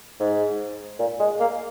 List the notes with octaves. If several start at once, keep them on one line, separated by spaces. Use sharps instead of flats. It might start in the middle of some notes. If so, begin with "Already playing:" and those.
G#2
A#2
G#3
A#3